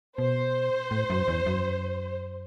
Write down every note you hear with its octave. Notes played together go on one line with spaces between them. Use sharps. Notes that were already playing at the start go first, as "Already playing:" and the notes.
B2 C5
A2
F#2
E2
F#2